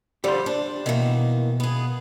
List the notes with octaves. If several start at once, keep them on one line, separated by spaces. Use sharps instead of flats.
D3 F3 G3 G4 C5
D4
B2 D#3 E3 A#3
B3 G#4